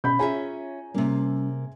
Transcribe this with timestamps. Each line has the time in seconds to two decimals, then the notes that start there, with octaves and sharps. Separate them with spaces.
0.04 B2 C#4 B5 G6
0.19 C#4 F4 G#4 C#5 E5 G#5 A#5
0.94 C3 G3 A#3 C#4